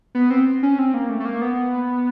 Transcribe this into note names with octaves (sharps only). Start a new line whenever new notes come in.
B3
C4
C#4
C4
A#3
A3
A3
A#3
B3